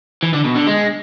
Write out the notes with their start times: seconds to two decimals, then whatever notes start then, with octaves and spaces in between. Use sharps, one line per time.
0.23 E3
0.34 D3
0.45 B2
0.56 D3
0.67 G#3